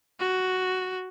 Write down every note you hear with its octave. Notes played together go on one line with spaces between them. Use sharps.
F#4